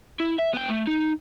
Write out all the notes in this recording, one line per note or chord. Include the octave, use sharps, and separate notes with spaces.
E4
E5
B3 G5
A3
D#4